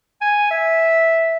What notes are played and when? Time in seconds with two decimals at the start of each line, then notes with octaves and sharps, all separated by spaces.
0.22 G#5
0.51 E5